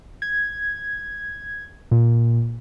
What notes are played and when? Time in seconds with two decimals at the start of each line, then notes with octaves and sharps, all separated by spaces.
0.22 G#6
1.91 A#2